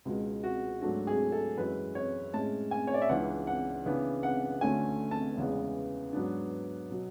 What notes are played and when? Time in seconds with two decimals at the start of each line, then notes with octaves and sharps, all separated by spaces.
0.05 C#2 B2 G#3
0.43 F#4
0.81 G#2 F#3 A3 D4 F#4
1.07 G#4
1.32 A4
1.57 F#2 E3 G#3 B4
1.95 C#5
2.34 A2 G#3 C#4 A5
2.71 G#5
2.87 C#5
2.94 D5
3.02 E5
3.09 C#2 C#3 E3 B3 D4 F#5
3.47 F#5
3.86 C#3 E3 B3 D4
4.23 F#5
4.61 D2 D3 A3 C#4 G#5
5.11 A5
5.37 E2 C#3 E3 G#3 B3
6.13 G#2 F#3 B3 D4
6.90 B2 F#3